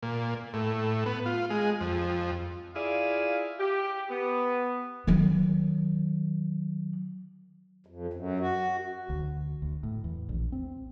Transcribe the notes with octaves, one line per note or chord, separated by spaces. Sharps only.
A#2
A2
B3
F4
G#3
F2
E4 F4 G#4 D5 F5
G4
B3
D#3 F#3
F2
F#2
F#4
D2
D2
A2
E2
A#1
C4